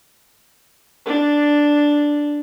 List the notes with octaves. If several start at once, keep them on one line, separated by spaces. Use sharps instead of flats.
D4